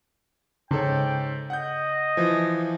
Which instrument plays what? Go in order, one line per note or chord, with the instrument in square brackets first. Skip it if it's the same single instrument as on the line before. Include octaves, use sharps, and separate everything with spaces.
[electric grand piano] G#2 A4 C#5 [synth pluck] C#3 [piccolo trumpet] G5
[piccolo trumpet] D#5 [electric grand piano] F#5 G6
[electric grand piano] E3 F3